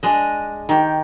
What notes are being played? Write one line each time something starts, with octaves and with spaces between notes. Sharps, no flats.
G#3 D4 D#5
D#3 G4